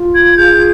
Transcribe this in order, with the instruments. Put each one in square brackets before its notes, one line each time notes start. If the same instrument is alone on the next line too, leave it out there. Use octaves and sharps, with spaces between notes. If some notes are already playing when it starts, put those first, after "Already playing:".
Already playing: [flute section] F4
G#6
G#4 G6